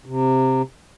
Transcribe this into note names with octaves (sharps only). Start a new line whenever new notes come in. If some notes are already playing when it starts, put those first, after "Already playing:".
C3